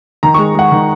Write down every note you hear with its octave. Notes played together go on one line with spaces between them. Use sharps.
D#3 A#5
C#6
G#3
G#3 F#5
D#3